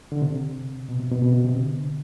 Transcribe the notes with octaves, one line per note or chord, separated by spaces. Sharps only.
D3
C3
B2
C3
B2
B2
C3
C3
D3